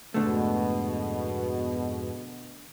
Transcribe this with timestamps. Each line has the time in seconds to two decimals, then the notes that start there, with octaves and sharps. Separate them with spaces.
0.14 F2 G#2 B2 D3 G#3 A3